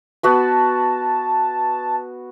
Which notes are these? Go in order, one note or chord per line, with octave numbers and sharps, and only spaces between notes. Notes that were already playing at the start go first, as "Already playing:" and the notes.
B3 F#4 B4 A5